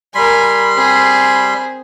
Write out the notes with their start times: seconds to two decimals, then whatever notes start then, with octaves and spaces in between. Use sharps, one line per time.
0.15 G3 A#4 G#5 B5 C6
0.75 C4 G#4